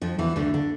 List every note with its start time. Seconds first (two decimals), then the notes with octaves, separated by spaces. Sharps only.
0.01 F2 F3
0.18 E2 E3
0.36 D2 D3
0.54 D3